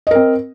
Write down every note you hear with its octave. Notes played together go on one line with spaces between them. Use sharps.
C4 A#4 D#5